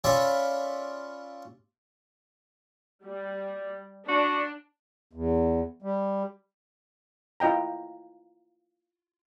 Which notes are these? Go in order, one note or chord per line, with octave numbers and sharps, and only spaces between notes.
C#4 F4 C#5 D5 E5 B5
G3
D4 F#4
E2
G3
E4 F4 D#5 G5 A#5